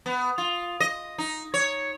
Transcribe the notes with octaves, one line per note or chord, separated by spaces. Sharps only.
B3
F4
D#5
D#4
C#5